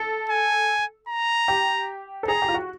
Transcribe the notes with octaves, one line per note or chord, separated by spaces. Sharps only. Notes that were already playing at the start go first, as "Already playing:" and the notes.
Already playing: A4
G#5
A#5
G4
A4
G#4 A#5
G4
F4
F#4